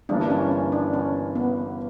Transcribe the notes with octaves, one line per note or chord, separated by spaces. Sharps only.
G1 G2 E3 A#3 D4
C#4
C#4
D4
C#4
B3